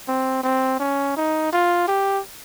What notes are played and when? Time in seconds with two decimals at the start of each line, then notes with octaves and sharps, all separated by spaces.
0.08 C4
0.44 C4
0.79 C#4
1.17 D#4
1.53 F4
1.88 G4